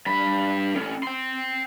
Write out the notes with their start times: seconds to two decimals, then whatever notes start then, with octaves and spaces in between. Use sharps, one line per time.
0.06 G2 B5
0.74 A2 C#4
1.03 G5 C6